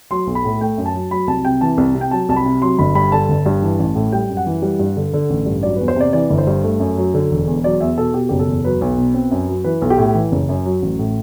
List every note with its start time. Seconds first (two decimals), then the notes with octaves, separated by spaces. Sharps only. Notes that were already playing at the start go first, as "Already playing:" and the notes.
0.11 F#3 C6
0.27 B1
0.35 B5
0.45 A2
0.61 A3 G5
0.78 F#2
0.86 A5
0.94 F#3
1.11 F#3 B5
1.27 C2 A5
1.45 C3 G5
1.61 E3 A5
1.77 C2
1.95 C3
2.01 G5
2.11 F#3 A5
2.29 C2 A5
2.36 B5
2.45 C3
2.62 F#3 C6
2.79 G1 B5
2.95 G2 B5
3.12 D3 A5
3.29 G1
3.46 G2
3.62 E3
3.79 A1
3.95 A2
4.12 G3 G5
4.29 F#2
4.37 F#5
4.46 E3
4.62 G3
4.79 G2
4.97 D3
5.13 D3
5.30 A1
5.46 G2
5.63 F#3 D5
5.76 E2 B4
5.88 C5
5.96 C3 D5
6.13 E3 D5
6.30 G1
6.38 C5
6.47 G2
6.64 A3
6.80 F#2
6.97 F#3
7.14 D3
7.31 E1
7.47 E2
7.64 F#3 D5
7.81 E2 E5
7.97 B2 A4
8.14 B2 G4
8.29 F#1 G4
8.39 A4
8.48 E2
8.65 F#3 B4
8.81 B1
8.98 B2
9.14 C4
9.31 F#2
9.48 F#3
9.64 E3 B4
9.82 B1
9.90 G4
9.98 A2
10.15 E3
10.32 F#1
10.49 F#2
10.65 F#3
10.82 A1
10.99 A2